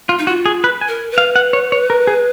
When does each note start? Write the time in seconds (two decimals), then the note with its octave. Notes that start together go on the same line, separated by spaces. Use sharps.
0.09 F4
0.19 D#4
0.27 F4 F#4
0.46 G#4
0.64 B4
0.81 G#5
0.88 A#4
1.11 B4
1.18 F5
1.36 F#5
1.53 C#5
1.72 C#5
1.90 A#4
2.07 G#4